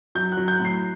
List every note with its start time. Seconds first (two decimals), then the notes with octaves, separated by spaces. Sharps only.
0.15 F#3 G6
0.32 F#6
0.37 F#3
0.48 G6
0.59 A2
0.65 C7